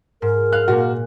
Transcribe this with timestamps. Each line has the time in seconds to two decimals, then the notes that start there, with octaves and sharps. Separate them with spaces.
0.22 G#2 A#4
0.53 F5 F#6
0.68 A#2 A#3 F#4